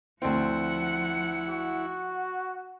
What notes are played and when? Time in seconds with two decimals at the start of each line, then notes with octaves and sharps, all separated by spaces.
0.22 D2 F3 C4 E4 F#5
1.49 F#4